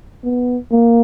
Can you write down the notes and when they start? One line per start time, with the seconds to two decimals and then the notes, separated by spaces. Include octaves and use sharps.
0.24 B3
0.72 A#3